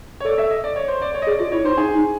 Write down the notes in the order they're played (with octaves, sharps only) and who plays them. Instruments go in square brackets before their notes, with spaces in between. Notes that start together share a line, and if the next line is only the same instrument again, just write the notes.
[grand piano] C#5
[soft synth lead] A4 [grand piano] D5
[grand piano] E5
D#5
D5
C#5
C5
D5
C#5
D#5
[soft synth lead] G#4 [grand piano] D5
[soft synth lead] F4 [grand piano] D5
[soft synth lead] E4 [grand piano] C#5
[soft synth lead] D#4 [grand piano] C5
[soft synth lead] D#4 [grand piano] G#4
[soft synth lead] D#4